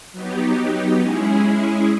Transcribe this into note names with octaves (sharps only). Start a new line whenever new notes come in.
F#3 B3 D#4 G4
G#3 C#4 E4 G#4